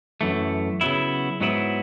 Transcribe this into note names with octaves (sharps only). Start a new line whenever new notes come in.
F#2 E3 A3
C#3 F#3 B3 E4
G#2 F#3 B3 E4